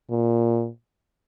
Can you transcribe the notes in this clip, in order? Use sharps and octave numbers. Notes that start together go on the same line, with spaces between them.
A#2